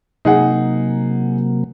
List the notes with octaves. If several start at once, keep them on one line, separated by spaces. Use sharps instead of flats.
C3 F#3 A#3 D#4 G#4 F#5